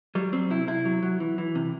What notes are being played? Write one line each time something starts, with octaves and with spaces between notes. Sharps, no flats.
F#3 G3
F#3 C4
C3 E4
C3 E4
F#3
F#3
E3
E3
C3